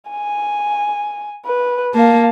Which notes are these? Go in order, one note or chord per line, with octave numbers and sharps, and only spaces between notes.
G#5
B4
A#3 F5 A5